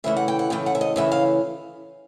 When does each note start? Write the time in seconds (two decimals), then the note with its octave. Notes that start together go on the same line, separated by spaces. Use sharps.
0.04 C#3 E3 A3 E5
0.17 F#5
0.28 G5
0.39 F#5
0.50 C#3 E3 A3 G5
0.66 F#5
0.75 E5
0.81 D#5
0.96 C#3 E3 A3 E5
1.12 F5